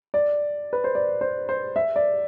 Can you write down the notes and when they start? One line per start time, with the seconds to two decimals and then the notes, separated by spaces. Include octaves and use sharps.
0.14 D5
0.73 B4
0.84 C5
0.95 D5
1.21 C5
1.49 C5
1.76 E5
1.96 D5